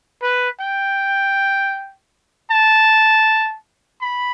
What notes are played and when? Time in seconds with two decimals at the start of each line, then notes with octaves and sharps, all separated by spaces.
0.22 B4
0.60 G5
2.50 A5
4.01 B5